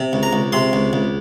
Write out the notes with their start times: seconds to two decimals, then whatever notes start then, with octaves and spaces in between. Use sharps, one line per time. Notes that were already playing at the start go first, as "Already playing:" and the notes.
Already playing: C3
0.13 C#2
0.23 A#5
0.33 C#2
0.53 C3 C6
0.73 C#2
0.93 C#2